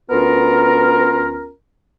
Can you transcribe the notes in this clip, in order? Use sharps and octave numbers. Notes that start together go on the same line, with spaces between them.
D2 B3 C#4 F4 A#4